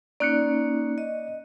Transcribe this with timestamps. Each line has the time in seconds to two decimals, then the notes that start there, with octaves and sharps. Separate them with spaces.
0.20 A#3 C#4 D#4 D5 F#6 C#7
0.98 D#5